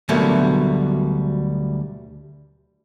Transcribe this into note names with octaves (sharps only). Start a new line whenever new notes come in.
D2 B2 F#3 G3 A3 A#3